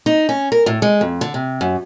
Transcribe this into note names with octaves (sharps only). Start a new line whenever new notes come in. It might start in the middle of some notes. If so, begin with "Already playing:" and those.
D#4
C#4
A#4
A2
G#3
F2
D3
C3
F#2